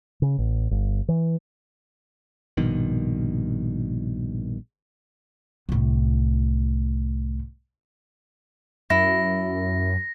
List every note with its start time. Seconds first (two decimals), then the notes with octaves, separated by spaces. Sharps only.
0.22 C#3
0.38 A1
0.71 G1
1.08 E3
2.57 A#1 G2 B2 D#3
5.69 C2 A2
8.90 F#2 E4 A#6